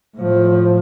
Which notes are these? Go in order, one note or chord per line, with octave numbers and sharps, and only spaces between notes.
A2 F3